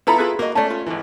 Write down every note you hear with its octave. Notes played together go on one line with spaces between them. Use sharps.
B3 E4 F4 A4 A#5 B5
F4 G#4 B4
A#3 F#4 D#5
A3 C#4 D5 A5
F4
G#1 E3